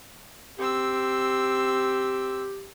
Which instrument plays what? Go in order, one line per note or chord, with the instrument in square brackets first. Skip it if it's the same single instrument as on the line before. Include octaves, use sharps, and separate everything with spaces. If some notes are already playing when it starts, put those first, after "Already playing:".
[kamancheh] C4 E6 [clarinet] G4